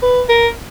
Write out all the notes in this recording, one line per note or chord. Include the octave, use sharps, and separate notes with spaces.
B4
A#4